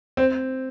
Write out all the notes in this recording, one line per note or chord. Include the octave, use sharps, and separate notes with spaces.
C4